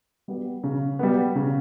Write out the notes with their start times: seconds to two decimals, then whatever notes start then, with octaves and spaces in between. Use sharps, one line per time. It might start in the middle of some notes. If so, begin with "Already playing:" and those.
0.28 G3 B3
0.64 C#3
0.99 G3 B3
1.35 C#3